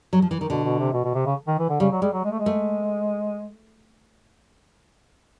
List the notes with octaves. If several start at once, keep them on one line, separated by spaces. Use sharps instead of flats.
F#3
F3
E3
D#3
B2 D3
B2
C3
B2
B2
C3
C#3
D#3
E3
D3
C#3 G3
F#3
G3 G#3
F#3
G#3
A3
G#3
A3